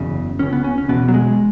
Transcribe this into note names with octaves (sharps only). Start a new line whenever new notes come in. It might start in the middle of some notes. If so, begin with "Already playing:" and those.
Already playing: F#1 E2 C#3
C#2 C#3 C#4
B3
C#4
C#4
E1 E2 B2 B3
F#3
G#3